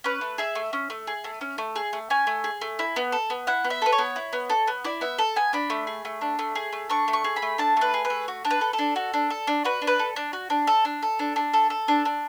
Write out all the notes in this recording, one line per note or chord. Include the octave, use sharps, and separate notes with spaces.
C#4 B4
A3
G#4 E5
A3
C#4
A3
G#4
A3
C#4
A3
G#4
A3
C#4 G#5
A3
G#4
A3
E4
B3
A4
B3
E4 F#5
B3
E5
A4 B4
C#5
B3
E4
B3
A4
B3
E4 D5
B3 E5
A4
B3 G#5
D4 B5
A3
G#4
A3
D4
A3
G#4
A3
D4 C#6
A3
C#6
G#4
B5
A3
D4 A5
A3 B4
G#4
B4
A3
F#4
D4
B4
A4
A4
D4
F#4
D4
A4
D4
F#4 B4
D4
B4
A4
D4
F#4
D4
A4
D4
A4
D4
D4
A4
A4
D4
D4